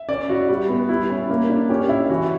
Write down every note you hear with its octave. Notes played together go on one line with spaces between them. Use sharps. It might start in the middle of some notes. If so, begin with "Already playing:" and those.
Already playing: E5
C#4 D5
E4 F#4
G3
B3
G3 E4
C#4
A#3
D4
C#4 G4
E4
E3 F#4